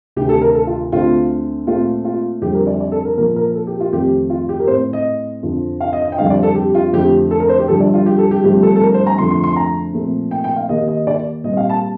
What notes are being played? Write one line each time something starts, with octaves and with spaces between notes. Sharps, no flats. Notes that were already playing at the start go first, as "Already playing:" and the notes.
D2 C3 D#3 G4
A4
A#4
A4
F4
D2 D3 A3 C4 F4
A#2 A3 C4 F4
F4
F2 D3 G3 C4 G4
A#4
D5
D5
A4
A#4
A#2 F3 A#3 A#4
A#4
A4
G4
F4
F2 D#3 A3 C4 G4
F4
G4
A#4
A2 A3 C4 C5
D#5
F2 D3 F3
F5
D#5
D#5
G5
F2 D3 G3 C4 F5
D5
A4
G4
F4
F2 D3 A3 G4
A4
A#4
C5
G4
G2 D3 F3 A4
D5
F4
G4
A4
G4
G2 D3 F3 A3 C4 G4
A4
A4
A#4
C5
A#5
F2 D3 F3 A3 C6
C6
C6
A#5
A#2 F3 A3 C4
G5
G5
F5
D#2 D#3 A#3 D#5
D#5
D5
A#2 G3 C4 D#5
F5
A5